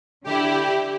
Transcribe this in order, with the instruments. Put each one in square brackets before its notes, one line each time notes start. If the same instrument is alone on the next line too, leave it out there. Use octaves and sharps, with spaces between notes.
[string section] D3 E4 [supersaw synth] G4